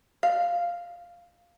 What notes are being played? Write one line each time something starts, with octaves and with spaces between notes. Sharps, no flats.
F5